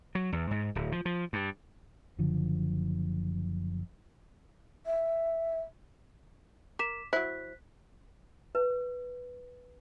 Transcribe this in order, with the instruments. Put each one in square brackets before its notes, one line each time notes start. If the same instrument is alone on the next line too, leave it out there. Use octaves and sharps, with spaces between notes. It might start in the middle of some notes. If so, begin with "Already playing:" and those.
[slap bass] F#3
E2
G#2
D1
F3
F3
G2
[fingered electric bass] F#1 D3 F3
[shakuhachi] E5
[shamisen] A#4 [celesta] D6 B6 E7
[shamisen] F#3 E4 [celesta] C5 F#6 B6
[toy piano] B4